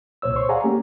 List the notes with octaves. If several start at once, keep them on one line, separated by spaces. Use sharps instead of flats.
C2 A#2 C5 C#5 E6
C5 C#5 C6 C#6
G#4 D5 F5 F#5 G#5 A#5
A3 A#3 C#4 G4